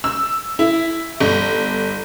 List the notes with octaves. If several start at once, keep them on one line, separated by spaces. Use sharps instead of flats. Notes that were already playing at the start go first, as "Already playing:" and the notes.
E6
E4
G1